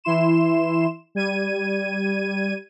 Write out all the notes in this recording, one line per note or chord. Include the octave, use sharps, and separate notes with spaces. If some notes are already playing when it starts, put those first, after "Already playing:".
E3 E4 C6 E7
G3 G#6 D#7